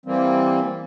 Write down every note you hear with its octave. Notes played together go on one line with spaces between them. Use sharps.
E3 G3 A#3 C4